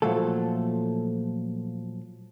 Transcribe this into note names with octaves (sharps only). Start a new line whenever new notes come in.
A#2 F3 F#3 A3 A4